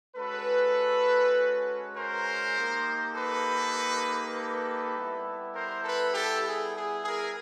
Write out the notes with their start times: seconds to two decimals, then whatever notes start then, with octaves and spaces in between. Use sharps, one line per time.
0.15 G#3 C#4 F#4 A4 B4
1.95 A#4 C5
2.56 A#3 D#4 G4
3.15 A4 B4
4.34 A4 B4
4.96 G3 B3 E4 G4
5.54 A#4 C5
5.84 A4 B4
6.14 G4 A4
6.44 G#4
6.75 G#4
7.04 G#4 A#4